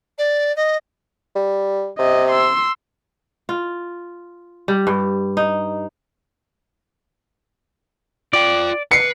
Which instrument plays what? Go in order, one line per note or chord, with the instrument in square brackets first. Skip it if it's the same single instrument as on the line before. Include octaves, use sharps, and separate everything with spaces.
[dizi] D5
D#5
[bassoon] G3
[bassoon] C3 [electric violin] D#5
[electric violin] C6 E6
[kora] F4
G3
G2
D#4
[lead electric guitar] F4 G5 [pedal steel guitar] D5
[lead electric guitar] B4 [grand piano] C7 C#7